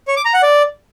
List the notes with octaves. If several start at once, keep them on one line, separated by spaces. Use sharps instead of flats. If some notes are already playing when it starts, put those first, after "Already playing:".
C#5
D6
A#5
F#5
D5